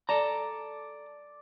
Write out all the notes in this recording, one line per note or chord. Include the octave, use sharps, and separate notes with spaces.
A4 D5 A5 A#5